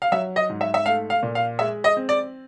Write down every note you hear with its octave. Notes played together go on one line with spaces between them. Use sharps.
F5
F#3 E5
D#5
G#2
E5
E5
A3 F5
F5
A#2
F5
G#3 E5
D#5
C4
D5